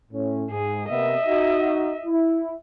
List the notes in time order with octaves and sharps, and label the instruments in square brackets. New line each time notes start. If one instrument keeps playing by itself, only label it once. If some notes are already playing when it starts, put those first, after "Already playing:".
[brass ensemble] A2 C#4
[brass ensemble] G#2 [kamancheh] G#4
[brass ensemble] C3 A#3 B3 [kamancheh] D#5 E5
[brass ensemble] D#4 F#4
E4